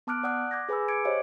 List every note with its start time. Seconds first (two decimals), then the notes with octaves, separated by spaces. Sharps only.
0.07 B3 A5 D6 F6 F#6 D7
0.23 D5 F#5 D#6 F#6
0.51 D6 G6 G#6 A#6
0.69 G#4 B4 G#5 B5 E6
0.88 D6 G#6 C#7 D7
1.05 G4 C5 C#5 D#5 F5